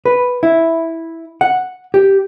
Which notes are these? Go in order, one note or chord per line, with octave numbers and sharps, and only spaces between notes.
B4
E4
F#5
G4